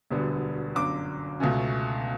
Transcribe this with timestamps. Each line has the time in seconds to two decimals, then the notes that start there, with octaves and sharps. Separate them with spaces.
0.11 E1 D2 D3 G3 B3
0.75 G1 F#2 D3 F#3 D6
1.40 C#2 B2 A3 C#4